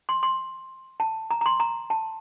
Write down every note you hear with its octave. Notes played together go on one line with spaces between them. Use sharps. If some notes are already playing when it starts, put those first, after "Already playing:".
C6
C6
A5
A#5
A#5
C6
A#5
A5